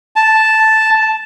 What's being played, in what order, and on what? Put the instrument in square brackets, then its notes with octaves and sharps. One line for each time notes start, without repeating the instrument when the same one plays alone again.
[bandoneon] A5